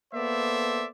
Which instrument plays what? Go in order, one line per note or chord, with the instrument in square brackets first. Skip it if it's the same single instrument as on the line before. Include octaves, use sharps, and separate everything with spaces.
[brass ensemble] A#3 B3 A4 C5 D5 E5